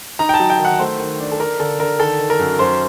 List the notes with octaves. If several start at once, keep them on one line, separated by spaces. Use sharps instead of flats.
D#4 A#5
G5
A5
F#3
G5
D#3
F#5
A3 C5
D#3
D4
A4
D4 A#4
D3 A4
D3 A#4
D#3 A4
D#3
A#4
F#2
F#2 C5